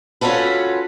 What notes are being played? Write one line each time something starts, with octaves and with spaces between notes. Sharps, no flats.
C#4 F4 F#4 A4 B4